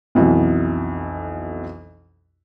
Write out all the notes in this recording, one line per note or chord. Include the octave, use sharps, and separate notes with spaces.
B1 F2 E3 F#3